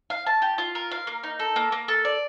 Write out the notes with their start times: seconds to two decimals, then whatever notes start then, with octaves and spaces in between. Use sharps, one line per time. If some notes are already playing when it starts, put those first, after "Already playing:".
0.10 F5
0.27 A5
0.42 G4
0.58 F4
0.75 A#4
0.91 F5
1.07 A#3
1.23 D#4
1.40 A4
1.56 A#3
1.72 A#3
1.88 A4
2.05 D5